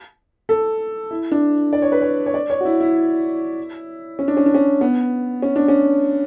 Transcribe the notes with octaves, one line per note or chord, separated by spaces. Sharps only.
A4
E4
D4
D5
C#5
B4
C#5
C#5
D5
C#5
F#4
E4
E4
C#4
D4
C#4
D4
C#4
B3
C#4
D4
C#4